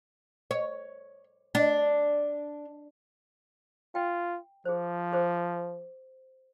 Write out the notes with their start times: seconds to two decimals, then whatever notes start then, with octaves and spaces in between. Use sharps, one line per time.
0.51 C#5
1.55 D4
3.95 F4 G5
4.65 F3 G#4 C5
5.13 G#4 C5